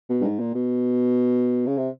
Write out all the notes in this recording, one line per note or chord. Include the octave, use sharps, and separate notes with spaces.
B2
G2
G#2
A#2
B2
C#3
C3